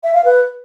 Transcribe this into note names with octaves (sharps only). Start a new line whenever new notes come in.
E5
F5
B4